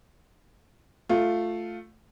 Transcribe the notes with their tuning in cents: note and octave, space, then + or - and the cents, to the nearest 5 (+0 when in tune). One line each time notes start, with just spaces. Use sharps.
A3 +0 F4 +5